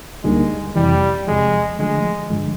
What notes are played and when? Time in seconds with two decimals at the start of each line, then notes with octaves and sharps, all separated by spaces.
0.24 D2 D3 G3 G#3 A#3 D#4
0.76 F2 C3 E3 G3
1.27 E2 C3 F3 G#3
1.79 D3 F3 G#3 A3
2.30 G2 D3 F3 G#3